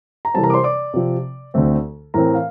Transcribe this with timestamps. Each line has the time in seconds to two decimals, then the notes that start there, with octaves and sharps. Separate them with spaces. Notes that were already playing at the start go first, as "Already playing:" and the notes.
0.25 A#5
0.34 C3 E3 G3 C4 A4 A5
0.44 A#4 A#5
0.50 D6
0.54 C5 C6
0.64 D5 D6
0.94 C3 F3 C4
1.54 D2 D3 A3 C4
2.14 A2 E3 A3 C4 A#4 A#5
2.35 F5